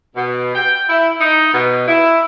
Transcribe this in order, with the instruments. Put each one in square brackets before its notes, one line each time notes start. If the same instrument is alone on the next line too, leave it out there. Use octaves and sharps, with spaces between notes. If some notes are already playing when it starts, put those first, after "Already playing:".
[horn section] B2
G5
E4
D#4
B2
E4